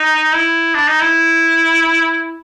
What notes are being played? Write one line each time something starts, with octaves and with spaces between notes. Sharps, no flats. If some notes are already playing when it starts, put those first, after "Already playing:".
Already playing: D#4
E4
D4
D#4
E4